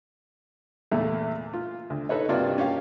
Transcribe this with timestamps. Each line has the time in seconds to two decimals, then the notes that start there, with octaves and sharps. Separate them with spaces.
0.91 E2 A#2 A3
1.54 F4
1.90 D2
2.09 D#4 A4 B4 C#5 D#5
2.29 G2 C3 A#3 D4 F4 F#4
2.58 C#4 G4 F5